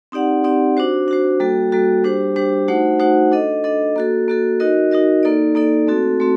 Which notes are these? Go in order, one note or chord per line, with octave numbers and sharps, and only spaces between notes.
C4 D#4 G4 D5 F#5
C4 D#4 G4 D5 F#5
D4 F#4 C5
D4 F#4 C5
G3 A#3 F#4 A4
G3 A#3 F#4 A4
G3 D4 G4 C5
G3 D4 G4 C5
A3 D#4 F#4 C5 F#5
A3 D#4 F#4 C5 F#5
D4 A4 D#5
D4 A4 D#5
A#3 F#4 A4
A#3 F#4 A4
D#4 F#4 A#4 D#5
D#4 F#4 A#4 D#5
A#3 D#4 A4 D5
A#3 D#4 A4 D5
A3 C4 F#4 A4
A3 C4 F#4